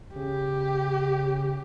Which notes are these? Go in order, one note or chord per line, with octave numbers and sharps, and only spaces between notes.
C#3 G4